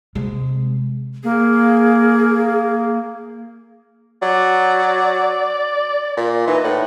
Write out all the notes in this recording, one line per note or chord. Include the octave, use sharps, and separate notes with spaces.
C3 G#3
A#3 G#4
F#3 D5
A#2
E3 D#4
A2 F#5